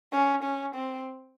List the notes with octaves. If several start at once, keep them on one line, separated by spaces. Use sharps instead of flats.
C#4
C#4
C4